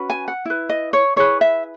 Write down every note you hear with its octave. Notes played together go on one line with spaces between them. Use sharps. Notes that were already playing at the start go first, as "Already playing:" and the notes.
Already playing: C#4 F#4 B4
G#5
F#5
E4 B4
D#5
C#5
E4 G#4 B4 C#5
E5